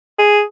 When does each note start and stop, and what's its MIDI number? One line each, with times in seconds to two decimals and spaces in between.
0.19 0.41 68